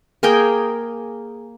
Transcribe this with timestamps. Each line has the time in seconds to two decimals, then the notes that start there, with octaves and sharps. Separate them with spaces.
0.23 A#3 G#4 A#4 G5